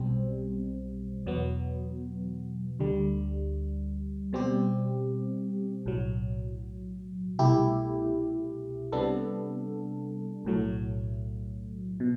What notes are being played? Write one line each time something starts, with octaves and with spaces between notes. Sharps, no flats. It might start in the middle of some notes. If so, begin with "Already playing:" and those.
Already playing: B1 B2 G3 C4
E2 B2 F#3 B3
D2 D3 G3
B2 G3 C4 G4
B1 A2 F#3
C2 B2 A3 E4 G4
C3 G3 B3 D4 A4
B1 A2 F#3 A3
B2